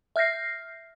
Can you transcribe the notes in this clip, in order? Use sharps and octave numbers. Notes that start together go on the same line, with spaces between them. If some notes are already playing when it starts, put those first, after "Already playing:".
E5 F6 G6 A#6 C7